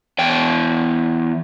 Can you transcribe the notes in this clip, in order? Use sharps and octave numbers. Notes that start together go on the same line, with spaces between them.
E2 G5